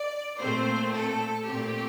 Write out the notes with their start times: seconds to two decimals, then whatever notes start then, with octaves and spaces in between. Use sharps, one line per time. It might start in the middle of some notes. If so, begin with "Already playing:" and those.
Already playing: D5
0.39 A#2 A3 C4 C5
0.93 A4
1.46 A#2 A3 C4 G4